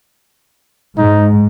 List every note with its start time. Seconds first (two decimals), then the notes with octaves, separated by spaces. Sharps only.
0.98 G#2 D#4